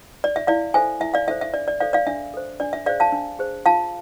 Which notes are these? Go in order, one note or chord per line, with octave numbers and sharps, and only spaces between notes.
D5
E5
E4 D5 F5
A4 C5 E5 G#5
E4 E5
D5 F5
A4 C5 E5
E5
D4 D5
D5
A4 C5 D5 F5
D5 F5
D4 E5
A4 C5
D4 D5
E5
G#4 C5 D5 F5
F5 A5
D4
G#4 C5
F4 F5 A5